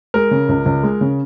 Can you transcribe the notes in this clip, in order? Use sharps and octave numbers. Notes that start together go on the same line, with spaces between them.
G#3 A#4
C#3
C#2
C#2
G#3
C#3